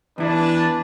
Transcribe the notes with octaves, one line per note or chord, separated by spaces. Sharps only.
E2 D4 E4 B4 A5